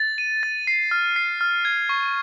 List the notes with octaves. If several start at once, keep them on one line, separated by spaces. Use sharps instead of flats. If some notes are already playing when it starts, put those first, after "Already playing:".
Already playing: A6
D#7
A6
C7
F6
C7
F6
G#6
C#6